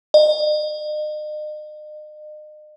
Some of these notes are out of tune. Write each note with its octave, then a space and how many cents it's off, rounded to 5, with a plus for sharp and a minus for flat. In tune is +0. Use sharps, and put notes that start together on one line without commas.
D#5 -40